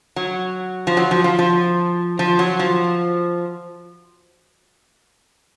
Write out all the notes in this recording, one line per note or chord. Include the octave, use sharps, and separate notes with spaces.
F#3
F3
F#3
F3
F3
F3
F3
F#3
F3